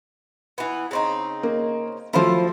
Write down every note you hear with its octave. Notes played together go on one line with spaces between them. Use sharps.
E3 B3
C#3 C4 D#4
A#3
F3 F#3 A3 E4 F4 C5